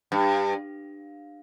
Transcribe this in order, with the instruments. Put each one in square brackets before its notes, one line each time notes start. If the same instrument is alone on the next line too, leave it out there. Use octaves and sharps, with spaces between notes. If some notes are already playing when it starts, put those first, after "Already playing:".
[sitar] G2